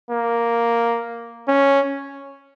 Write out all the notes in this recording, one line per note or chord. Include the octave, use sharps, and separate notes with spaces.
A#3
C#4